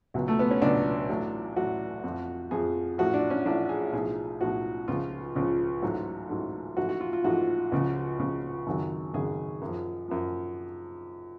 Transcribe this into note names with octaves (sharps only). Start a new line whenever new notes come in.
C#2 B2 F#3
A3
B3
C#4
C#2 B2 F#3 D4
A1 A2 F#3
A1 A2 F#3 F#4
F2 F3
F2 F3 G#4
A1 A2 F3 F#4
D4
C#4
A1 A2 F3 D4
G#4
B1 A2 F3 G#4
B1 A2 F3 F#4
C#2 C#3 F3 F4
C#2 C#3 F3
A1 G#2 F#3
A1 G#2 F#3
A1 G#2 F3 F#4
F#4
F4
F4
A1 G#2 F3 F#4
C#2 C#3 F3
C#2 C#3 F3
G#1 F#2 C#3 F#3
G#1 F#2 C#3 F#3 G#4
F#2 F3
F#2 F3